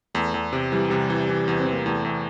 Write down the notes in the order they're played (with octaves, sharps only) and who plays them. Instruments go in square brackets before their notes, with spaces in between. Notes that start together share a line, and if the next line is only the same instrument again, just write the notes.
[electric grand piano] E2 [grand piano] A3
[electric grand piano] E2
C3
[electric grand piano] E3 [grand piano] G3
[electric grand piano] C3 [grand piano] G3
[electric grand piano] E3
E3
E2
[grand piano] C4
[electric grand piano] E3
[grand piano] A#3
[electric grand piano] E2 [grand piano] A3
[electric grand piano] E2